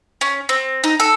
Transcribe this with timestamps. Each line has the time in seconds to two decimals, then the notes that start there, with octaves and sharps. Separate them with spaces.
0.21 C#4
0.49 C4
0.84 D#4
1.00 A4